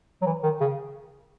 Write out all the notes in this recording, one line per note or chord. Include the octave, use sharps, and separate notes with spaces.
F#3
E3
D#3
C#3